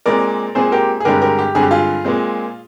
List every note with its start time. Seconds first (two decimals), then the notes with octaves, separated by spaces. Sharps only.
0.06 A#2 G#3 C4 A#4 D5
0.55 A#2 G#3 C4 G#4 C5
0.72 G4 A#4
1.00 G#4
1.05 G2 D3 G#3 C4 G4 A#4
1.22 G4 A#4
1.39 G4
1.55 G2 D3 G#3 C4 G#4
1.62 G4
1.71 F4 G#4
2.05 A#2 G#3 C4